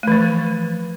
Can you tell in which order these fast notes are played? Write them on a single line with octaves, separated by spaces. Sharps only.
A3 E3 F3